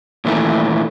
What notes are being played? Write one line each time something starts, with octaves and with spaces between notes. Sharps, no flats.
A#2 D#3 E3 A3